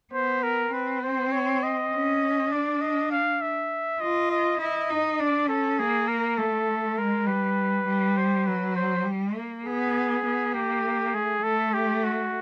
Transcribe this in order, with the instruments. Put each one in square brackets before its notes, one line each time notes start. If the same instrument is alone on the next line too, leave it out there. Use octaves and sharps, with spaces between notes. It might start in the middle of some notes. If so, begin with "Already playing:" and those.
[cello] B3 [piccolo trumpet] C5
[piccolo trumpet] A#4
[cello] C4 [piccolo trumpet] B4
[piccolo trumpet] C5
C#5
D#5
[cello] C#4
[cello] D4 [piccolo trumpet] D5
[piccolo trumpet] D#5
F5
E5
[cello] F4 [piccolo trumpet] D#5
[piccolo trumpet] D#5
[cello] E4 [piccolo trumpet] D#5
[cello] D#4
[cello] D4 [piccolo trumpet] D5
[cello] C#4 [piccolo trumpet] A4
[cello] A#3 [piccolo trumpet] G#4
[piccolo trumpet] A#4
[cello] A3 [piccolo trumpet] A4
[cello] G#3 [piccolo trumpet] A#4
[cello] G3 [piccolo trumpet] B4
[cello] G3
[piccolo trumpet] C5
[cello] F#3 [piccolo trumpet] B4
[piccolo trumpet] C5
[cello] G3
A#3
[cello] B3 [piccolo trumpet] G#4
[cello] B3
[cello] A#3 [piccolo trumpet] G4
[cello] A3 [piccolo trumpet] G#4
[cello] A3 [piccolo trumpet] A4
[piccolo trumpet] G4
F#4